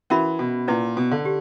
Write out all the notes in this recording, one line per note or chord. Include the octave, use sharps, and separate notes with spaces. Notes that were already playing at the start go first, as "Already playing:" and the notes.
E3 C#4 F#4 A#4 E5 B5
B2
A#2 C#4 E4 B4 D5
B2
D3
G4